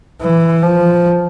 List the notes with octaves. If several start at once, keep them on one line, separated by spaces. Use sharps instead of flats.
E3
F3